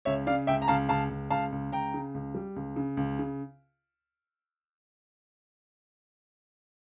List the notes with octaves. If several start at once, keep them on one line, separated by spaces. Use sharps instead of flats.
C#2 C#5 E5
C#3 D5 F5
C#2 E5 G5
A#5
C#2 F5 A5
C#2 F5 A5
C#2
C#2 F5 A5
C#2
C#2 G5 A#5
C#3
C#2
G3
C#2
C#3
C#2
C#3